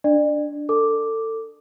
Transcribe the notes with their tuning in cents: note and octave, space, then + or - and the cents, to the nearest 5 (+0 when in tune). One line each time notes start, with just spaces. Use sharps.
D4 +0 D5 +30
A4 +25 D6 +0